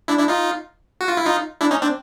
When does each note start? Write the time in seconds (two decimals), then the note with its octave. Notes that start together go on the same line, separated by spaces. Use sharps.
0.08 D4 E4
0.19 D4 E4
0.28 D#4 F4
1.01 F#4
1.08 F4
1.17 E4
1.25 D#4 F4
1.61 D4 E4
1.71 C#4 D#4
1.82 C4 D4